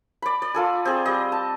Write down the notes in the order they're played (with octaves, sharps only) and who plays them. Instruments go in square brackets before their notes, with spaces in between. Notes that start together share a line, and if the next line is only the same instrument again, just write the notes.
[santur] D5 B5
D5
F4 A4 G#5
C4 G#4
G3 D#5
A5